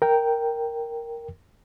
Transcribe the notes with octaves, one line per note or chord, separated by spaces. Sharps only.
A#4 G5